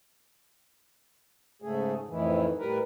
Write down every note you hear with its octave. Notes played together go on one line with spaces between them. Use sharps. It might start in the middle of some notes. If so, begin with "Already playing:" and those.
G#2 C#3 A3 G#4
F2 A2 D#3 E3
A2 G3 A#4 B4